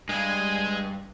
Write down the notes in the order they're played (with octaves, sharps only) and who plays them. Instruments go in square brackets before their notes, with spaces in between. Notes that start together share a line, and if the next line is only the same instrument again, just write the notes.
[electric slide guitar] G2 [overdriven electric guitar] G#3 [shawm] G#5